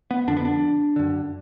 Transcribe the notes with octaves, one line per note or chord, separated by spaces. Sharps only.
B3
F2 D3 D4
B3
D4
F#2 D3